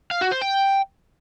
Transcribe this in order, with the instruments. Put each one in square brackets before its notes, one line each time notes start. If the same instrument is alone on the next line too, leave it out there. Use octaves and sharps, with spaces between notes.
[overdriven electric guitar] F5
F#4
C5
G5